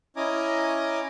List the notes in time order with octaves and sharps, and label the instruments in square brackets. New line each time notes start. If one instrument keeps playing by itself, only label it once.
[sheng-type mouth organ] C#4 E4 D#5 G#5 A#5 D6